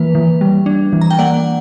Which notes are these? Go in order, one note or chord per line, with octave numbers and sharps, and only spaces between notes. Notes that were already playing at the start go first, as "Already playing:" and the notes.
Already playing: E3 A#3 B4
E3
G3
D4
E3
A#5
G5
A#3 D5 F#5